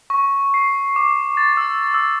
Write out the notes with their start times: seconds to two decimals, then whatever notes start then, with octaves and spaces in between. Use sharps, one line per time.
0.10 C#6
0.54 C7
0.96 D6
1.37 A6
1.57 E6
1.94 E6